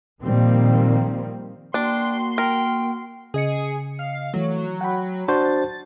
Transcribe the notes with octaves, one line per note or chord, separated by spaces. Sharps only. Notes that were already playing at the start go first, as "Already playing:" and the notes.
A#2 D#3 F3 G3 A#3 C4
A#3 D4 F#4 G5 C6
A#4 G5
C#3 G#4 D#5 C#7
F5
E3 F#3 A3
F#5 G5 B5
D4 F#4 C5 A6